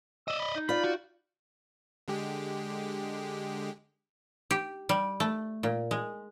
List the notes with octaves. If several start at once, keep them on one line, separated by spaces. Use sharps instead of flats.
D5 D#5 E6
B5
D#4
F4 D5 B5
F#4
D3 G#3 G4
G4
G3
A3
A#2
G#3